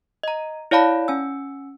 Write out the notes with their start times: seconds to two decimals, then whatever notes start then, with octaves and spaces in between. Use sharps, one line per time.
0.23 D#5 A#5
0.71 E4 C#5 D5 F5 A5 B5
1.08 C#4 G#5 E6